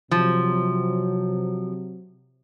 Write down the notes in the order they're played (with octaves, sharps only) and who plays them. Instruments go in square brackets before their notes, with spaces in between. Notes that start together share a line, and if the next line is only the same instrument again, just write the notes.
[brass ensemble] C3 F#3 [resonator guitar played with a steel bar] F3